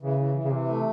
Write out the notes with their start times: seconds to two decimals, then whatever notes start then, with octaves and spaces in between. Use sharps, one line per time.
0.01 C#3 E3
0.19 E3
0.35 E3
0.44 C#3
0.52 C3 E3
0.69 A3